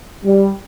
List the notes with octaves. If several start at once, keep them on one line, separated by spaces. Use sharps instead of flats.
G3